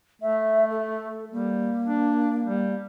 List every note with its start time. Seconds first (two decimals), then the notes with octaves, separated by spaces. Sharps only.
0.22 A3 E5
0.70 A4
1.32 G3 A#3
1.85 D4
2.46 G3